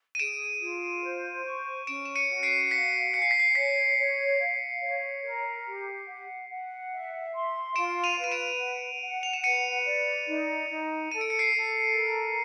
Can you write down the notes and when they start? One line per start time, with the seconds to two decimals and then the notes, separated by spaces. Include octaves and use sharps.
0.15 D#7
0.19 G#4 D7 E7
0.61 F4
1.04 C5
1.45 C#6
1.87 C#4 D7 E7
2.05 E7
2.16 C#7 D#7
2.29 F#4
2.43 C7 D7
2.71 F5 B6 C#7
3.14 G#5 C#7
3.22 C7
3.31 B6
3.39 C7
3.55 C#5 B6 C#7
3.98 C#5
4.40 F5
4.82 C#5
5.24 A#4
5.66 G4
6.07 F#5
6.50 F#5
6.92 E5
7.33 C6
7.76 F4 D7 E7
8.04 D#7 F7
8.18 B4
8.24 D#7
8.32 D7 E7
8.59 F#5
9.02 F#5
9.23 F7
9.33 E7
9.44 B4 C#7 D#7
9.86 D5
10.27 D#4
10.70 D#4
11.11 A4 D#7
11.21 D7
11.30 C#7
11.39 C7 D7
11.54 A4
11.95 A#4